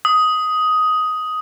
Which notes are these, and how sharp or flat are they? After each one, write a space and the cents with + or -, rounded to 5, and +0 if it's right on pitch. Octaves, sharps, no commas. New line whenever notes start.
D#6 +10